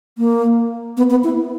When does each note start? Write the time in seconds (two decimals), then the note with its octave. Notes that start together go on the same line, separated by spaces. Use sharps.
0.18 A#3
0.97 B3
1.10 B3
1.24 E4